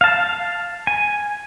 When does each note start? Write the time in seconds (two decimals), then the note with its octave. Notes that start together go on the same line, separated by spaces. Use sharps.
0.01 F5 A5
0.87 G#5